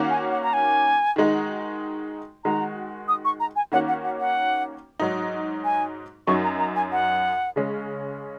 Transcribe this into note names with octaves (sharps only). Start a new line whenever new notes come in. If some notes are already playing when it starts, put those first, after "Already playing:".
Already playing: D#3 A#3 C#4 F#4
G#5
F#5
A#5
G#5
D#3 G#3 D#4 F#4
D#3 G#3 F#4 A#5
D#6
C#6
A#5
G#5
D#3 A#3 C#4 F#4 F#5
F#5
F#5
F#5
G#2 F#3 D#4
G#5
F#2 F#3 D#4 C#6
A#5
A#5
G#5
F#5
C#3 G#3 C#4